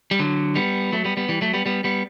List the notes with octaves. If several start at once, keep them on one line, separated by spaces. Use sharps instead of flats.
G3
D3 F#3
G3 B3
F#3 A3
G3 B3
G3 B3
E3 G3
F#3 A3
G3 B3
G3 B3
G3 B3